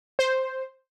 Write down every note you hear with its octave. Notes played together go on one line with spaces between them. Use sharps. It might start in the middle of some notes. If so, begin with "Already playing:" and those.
C5